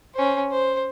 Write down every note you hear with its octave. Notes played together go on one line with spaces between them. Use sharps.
C#4 C5
C5